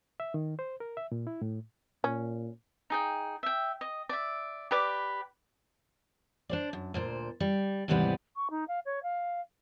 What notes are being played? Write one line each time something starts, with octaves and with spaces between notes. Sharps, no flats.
E5
D#3
C5
A#4
E5
A#2
E4
A2
A#2 C#4
D#4 G#4 G5
E5 G5
D#5
D5 E5
G4 B4 D5 D6
D4 C5 D5
F#2
D2 A#2 C5
G3
D#2 G#2 C3 E3 G3 B3
C#6
D#4
F5
C#5
F5